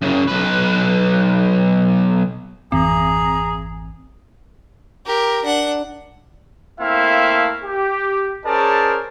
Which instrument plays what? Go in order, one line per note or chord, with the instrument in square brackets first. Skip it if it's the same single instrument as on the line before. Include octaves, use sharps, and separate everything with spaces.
[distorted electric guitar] F#2 C#3
B1 B4
[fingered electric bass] G#1 F2 E3 [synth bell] C4 [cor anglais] G#4 [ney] A#5
[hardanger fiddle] G4 A#4
D4 F#5
[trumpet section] A3 A#3 C4 E4 E5 F5
G4
C#4 G#4 A#4 C5 D5 A5